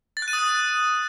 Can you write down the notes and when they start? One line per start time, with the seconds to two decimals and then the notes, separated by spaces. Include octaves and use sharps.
0.17 A6
0.22 F#6
0.28 D#7
0.33 D#6
0.39 F#6